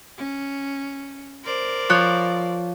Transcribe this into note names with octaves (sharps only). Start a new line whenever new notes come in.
C#4
A#4 C5 D5
F3 C#5 F#6